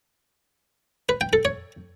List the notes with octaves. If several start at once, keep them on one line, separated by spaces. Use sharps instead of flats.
B4
G5
A4
C#5